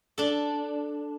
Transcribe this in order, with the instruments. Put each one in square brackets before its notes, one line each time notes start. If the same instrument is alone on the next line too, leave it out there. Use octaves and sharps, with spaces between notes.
[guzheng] D4 A4